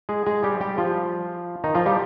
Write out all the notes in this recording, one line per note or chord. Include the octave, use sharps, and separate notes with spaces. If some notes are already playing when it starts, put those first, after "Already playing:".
G#3 G#4
G#3 G#4
G3 G4
G3 G4
F3 F4
D#3 D#4
F3 F4
G3 G4